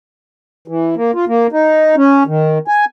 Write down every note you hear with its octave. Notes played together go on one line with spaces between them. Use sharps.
E3
A#3
F4
A#3
D#4
C#4
D#3
G#5